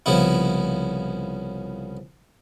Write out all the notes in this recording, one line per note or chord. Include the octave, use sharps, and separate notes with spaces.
C2 C#3 F3 B3 E4